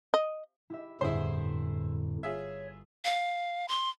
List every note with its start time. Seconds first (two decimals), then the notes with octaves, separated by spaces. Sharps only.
0.14 D#5
0.70 E4 G4 E5
1.01 G1 F2 A2 D3 E4 G#4 C5
2.23 F4 G#4 C#5 E5
3.05 F5
3.68 C6